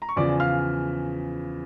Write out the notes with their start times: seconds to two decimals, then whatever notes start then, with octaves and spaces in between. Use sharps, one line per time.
0.02 A#5
0.09 C#6
0.16 E2 C#3 F3 D5 D6
0.40 F5 F6